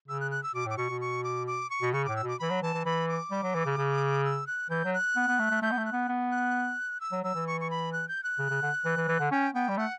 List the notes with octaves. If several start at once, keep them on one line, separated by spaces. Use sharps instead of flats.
C#3 E6
F#6
F#6
E6
B2 D6
A2
D6
B2 C#6
B2
C#6
D6
D6
C#6
B2
C#3 C#6
A2 D6
E6
B2 D6
E3 B5
F#3
E3 A5
E3
E3 B5
D6
G3
F#3
E3
C#3
C#3
E6
F#6
E3 G6
F#3
F#6
B3
B3
A3
A3
A3 G6
B3
A3
F#6
B3
B3
F#6
E6
F#3
F#3 E6
E3
C#6
C#6
B5
F#6
G6
F#6
C#3
C#3
D3
E3
E3
E3
D3
C#4 G5
B3 G5
G3
A3 F#5